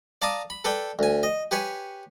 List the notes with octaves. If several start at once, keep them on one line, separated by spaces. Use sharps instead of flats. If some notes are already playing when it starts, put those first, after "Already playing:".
D5 F5 A5 A#5 D6 D#6
B5
A4 B4 D5 G5
D2 G#5
D#5
G4 B4 C#5 G#5